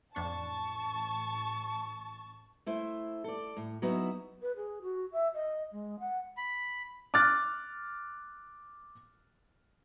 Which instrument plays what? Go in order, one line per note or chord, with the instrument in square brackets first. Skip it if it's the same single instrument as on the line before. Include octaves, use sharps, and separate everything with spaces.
[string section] A1 A5 [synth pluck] F2 D4 C#7 [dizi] C#6
[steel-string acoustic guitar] A3 E4 C5
A4 D5
A2
F#3 B3 D#4 E4 F#4
[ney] B4
G#4
F#4
E5
D#5
G#3
F#5
[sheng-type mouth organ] B5
[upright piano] D6 F6 F#6 A6